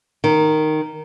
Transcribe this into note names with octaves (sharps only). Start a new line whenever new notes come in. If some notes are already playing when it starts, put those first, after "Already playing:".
D#3